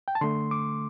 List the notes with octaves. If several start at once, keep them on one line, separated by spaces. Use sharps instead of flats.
G5
A5
D3 A3 C6
D6